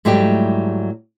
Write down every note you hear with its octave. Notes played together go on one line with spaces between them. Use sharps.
G#2 F#3 G3 A3 E4 G4